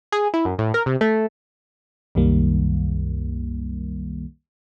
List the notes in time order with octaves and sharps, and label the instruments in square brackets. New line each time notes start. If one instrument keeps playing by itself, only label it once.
[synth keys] G#4
E4
F#2
A2
A#4
C3
A3
[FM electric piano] C2 F#2 D#3 G3 A#3